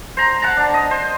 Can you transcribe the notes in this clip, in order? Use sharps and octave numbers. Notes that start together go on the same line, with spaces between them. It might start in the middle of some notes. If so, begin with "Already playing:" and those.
C5 A#5
F#5 A5 A#5
D4
D#5
C5